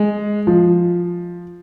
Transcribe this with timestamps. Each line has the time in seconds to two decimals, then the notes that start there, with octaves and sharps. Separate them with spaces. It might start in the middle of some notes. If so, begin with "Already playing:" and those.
Already playing: G#3
0.47 F3